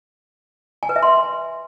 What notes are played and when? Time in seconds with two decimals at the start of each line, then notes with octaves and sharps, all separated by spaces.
0.83 G#5
0.89 B4
0.96 E5
1.03 C6